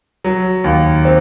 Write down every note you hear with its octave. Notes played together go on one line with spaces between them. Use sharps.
F#3
D#2
C4